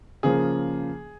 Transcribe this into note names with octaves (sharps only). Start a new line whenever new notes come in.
C#3 F3 A#3 G#4